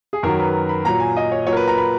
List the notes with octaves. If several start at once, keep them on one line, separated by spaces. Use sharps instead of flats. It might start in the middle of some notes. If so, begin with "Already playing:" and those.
G#4
F#2 D#3 F#3 A#4
B4
B5
A#2 F#3 A#5
G#5
D#5
C#5
A#2 F#3 C#5
A#4
B4
A#5
B5